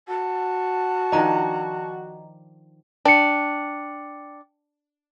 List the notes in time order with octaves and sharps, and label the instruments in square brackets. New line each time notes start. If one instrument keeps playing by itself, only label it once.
[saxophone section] F#4 [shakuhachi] A5
[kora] D#3 F3 D4 [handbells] D#5 A#5
[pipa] D4 [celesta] G5 C#7